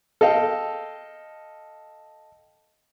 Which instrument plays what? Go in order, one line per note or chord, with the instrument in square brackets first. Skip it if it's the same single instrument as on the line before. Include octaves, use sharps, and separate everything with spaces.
[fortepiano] A4 D#5 F5 G5